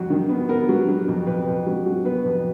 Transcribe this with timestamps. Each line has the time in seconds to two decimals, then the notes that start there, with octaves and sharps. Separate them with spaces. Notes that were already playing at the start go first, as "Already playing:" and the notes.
Already playing: F2 F#3
0.10 D#3
0.29 B3
0.49 B3 A#4
0.69 F#3
0.88 F#3
1.08 F2
1.27 F2 B4
1.48 F2
1.66 F#3
1.86 F#3
2.05 B3 B4
2.25 F2